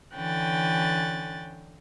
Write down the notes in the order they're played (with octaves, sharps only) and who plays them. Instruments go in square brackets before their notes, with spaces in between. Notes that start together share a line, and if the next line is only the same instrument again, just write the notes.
[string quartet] D3 E3 C#4 G5 F#6 A6